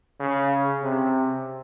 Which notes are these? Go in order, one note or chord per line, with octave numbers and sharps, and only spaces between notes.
C#3
C3